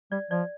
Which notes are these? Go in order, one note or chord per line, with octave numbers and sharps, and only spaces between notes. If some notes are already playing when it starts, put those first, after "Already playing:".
G3 D5
F3 D5